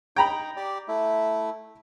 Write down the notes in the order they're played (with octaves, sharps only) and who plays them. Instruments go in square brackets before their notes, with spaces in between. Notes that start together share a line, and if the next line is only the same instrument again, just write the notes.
[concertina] D#4 [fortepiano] G5 A#5 B5
[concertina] G4 D5
A3 E4